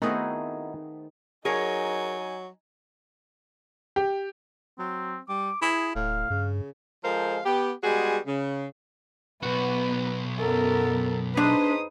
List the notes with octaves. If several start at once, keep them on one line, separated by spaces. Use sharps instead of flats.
D#3 A3 B3 C4 D#4 E4 F#4 G#4
F#3 D#4 G#4 A#4 C#5 G#5
G4
F#3 C4
G3 D6
E4 G#4
D1 A2 F5
G2 C#3
F3 G#3 A4 A#4 C5 F5
B3 G4
G3 G#3 B3 F#4 G#4
C#3
B1 B3 F#4 B4
F#2 B3 A4 A#4
D4 D#4 G#4 B4 C5 D#6